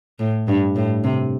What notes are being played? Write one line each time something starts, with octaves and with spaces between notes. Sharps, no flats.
A2
G2
A2
C3